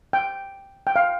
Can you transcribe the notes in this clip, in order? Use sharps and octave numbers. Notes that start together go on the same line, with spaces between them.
G5
G5
F5